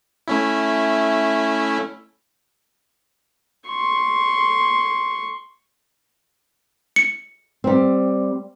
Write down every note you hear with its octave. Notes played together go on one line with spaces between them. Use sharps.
A3 C#4 E4
C6 C#6
C#7
G3 C4